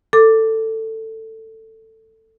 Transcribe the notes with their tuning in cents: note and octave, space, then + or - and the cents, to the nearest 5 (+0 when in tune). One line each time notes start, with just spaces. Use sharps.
A4 +15 D6 +0